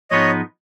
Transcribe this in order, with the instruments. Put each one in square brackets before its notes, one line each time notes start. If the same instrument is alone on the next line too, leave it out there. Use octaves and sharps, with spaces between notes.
[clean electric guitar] G#2 F3 G#3 B3 D#4 [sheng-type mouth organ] C#5 D#5